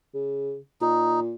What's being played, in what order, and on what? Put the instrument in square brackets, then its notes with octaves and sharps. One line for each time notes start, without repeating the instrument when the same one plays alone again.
[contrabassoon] C#3
[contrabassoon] A#2 [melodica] D#4